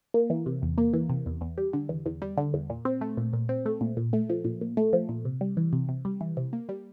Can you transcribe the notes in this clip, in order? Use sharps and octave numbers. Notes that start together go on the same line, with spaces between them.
A#3
E3
C3
E2
A#3
E3
C3
E2
E2
G3
D3
E2
E2
G3
D3
E2
A#2
C4
A3
A#2
A#2
C4
A3
A#2
A#2
A3
F3
A#2
A#2
A3
F3
A#2
C3
G3
E3
C3
C3
G3
E3
C3
A#3
G3